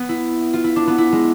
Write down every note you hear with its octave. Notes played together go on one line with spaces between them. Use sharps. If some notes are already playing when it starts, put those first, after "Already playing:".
Already playing: B3
E4
F4
E4
D4
B3
E4
G#3